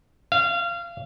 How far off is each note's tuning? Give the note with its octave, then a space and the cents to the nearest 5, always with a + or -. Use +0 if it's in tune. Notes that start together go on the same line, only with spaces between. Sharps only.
F5 -25